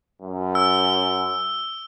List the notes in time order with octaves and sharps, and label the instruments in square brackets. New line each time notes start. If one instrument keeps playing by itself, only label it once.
[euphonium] F#2
[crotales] E6